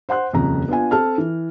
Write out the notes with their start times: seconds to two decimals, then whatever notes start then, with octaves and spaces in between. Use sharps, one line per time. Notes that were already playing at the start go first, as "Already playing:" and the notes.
0.09 C5 F#5 C6 F#6
0.33 D#1 F2 C#3 A#5
0.68 B3 D4 F4 G#5
0.91 C4 A4 A5 F6
1.18 E3